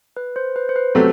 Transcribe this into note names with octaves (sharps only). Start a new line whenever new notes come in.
B4
C5
B4
C5
B4
C3 F#3 A3 A4